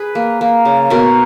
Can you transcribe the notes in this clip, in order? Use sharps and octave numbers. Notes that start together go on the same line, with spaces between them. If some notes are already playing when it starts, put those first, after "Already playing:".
Already playing: E4 G#4 B4
A#3
A#3
C#3
B2 A#4